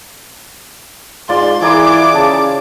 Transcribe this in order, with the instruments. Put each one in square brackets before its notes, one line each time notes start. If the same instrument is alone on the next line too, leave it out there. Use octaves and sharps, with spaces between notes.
[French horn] G#2 [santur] F4 D5 [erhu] C6
[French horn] E3 [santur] G#4 A#4 D5 [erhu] D6
[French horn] C#3 [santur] A5